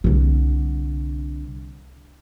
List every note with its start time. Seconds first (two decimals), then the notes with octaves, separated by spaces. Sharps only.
0.04 C2 D3